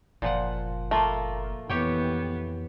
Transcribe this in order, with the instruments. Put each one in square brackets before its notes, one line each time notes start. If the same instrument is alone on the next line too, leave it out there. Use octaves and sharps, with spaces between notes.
[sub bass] F#1 [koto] A#2 F3 F#5
[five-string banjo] A3 [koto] A#3 F4 A#4
[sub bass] F2 [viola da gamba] E3 B3 [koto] G4 C#5 G5